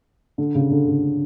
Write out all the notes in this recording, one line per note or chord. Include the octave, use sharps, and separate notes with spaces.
D3
C#3
D3
C#3